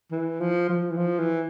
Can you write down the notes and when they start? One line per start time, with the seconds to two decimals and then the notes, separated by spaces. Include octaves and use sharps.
0.12 E3
0.41 F3
0.70 F3
0.91 E3
0.98 F3
1.19 E3